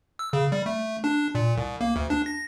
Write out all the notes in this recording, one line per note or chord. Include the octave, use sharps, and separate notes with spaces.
E6
C#3
G3
A3
D4
A#2
C2
A#3
D2
D4
A#6